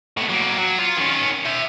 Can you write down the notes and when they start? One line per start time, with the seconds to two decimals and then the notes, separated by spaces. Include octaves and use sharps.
0.17 A2 B3
0.29 F#3 A#3
0.58 F#3
0.78 F4
0.97 D#3 C#4
1.45 E5 G5